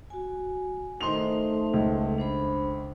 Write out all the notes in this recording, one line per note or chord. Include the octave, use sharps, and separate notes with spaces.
F#4 G#5
D#3 A3 D#4 C5 C6 F7
C#2
D4 C5 B5